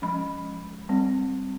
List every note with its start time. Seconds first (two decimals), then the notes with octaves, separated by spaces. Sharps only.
0.02 F3 G#3 C#4 B5
0.89 G3 C4